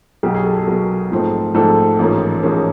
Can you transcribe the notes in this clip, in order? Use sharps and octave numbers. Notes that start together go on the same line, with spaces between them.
B1 B2 F#3 G4
G#4
A4
G#4
B1 B2 F#3 A#4
A#1 G#2 F3 A3 C4
A#1 G#2 F3 A3 C4 A4
A1 G#2 F3 A#3 C#4
A1 G#2 F3 A#3 C#4 G#4